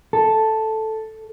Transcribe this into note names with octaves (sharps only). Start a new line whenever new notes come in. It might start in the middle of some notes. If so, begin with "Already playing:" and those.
A4